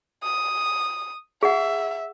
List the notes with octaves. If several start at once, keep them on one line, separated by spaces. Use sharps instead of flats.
D#6
G#4 E5 F#5